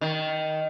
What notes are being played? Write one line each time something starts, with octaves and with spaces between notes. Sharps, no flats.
D#3